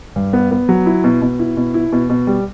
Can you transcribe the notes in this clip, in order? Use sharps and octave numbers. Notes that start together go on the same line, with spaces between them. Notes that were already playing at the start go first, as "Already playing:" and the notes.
G2
B3
B3
F#3
E4
B2
B2
E4
B2
E4
B2
B2
G3